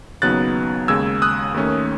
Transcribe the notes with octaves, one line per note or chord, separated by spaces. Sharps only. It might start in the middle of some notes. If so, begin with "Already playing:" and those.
D#2 C#3 F#3 B3 D#4 F#6 A6
D#2 C#3 G#3 E6 G#6
D#6 F#6
D#2 D#3 A3 C#4